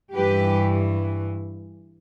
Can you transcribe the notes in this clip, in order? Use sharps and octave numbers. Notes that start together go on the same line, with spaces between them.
G2 E3 G4 B4